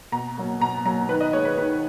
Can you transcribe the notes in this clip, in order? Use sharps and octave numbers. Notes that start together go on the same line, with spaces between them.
B2 A#5
F#3 A#3
B2 A#5
F#3 A#3 A#5
D#3 B4
D#5
G#3 C#5
B4
D#3 B4